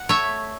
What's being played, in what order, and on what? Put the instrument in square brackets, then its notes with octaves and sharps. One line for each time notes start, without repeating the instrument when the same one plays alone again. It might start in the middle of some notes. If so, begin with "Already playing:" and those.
Already playing: [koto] F#5
A3 C#5 E5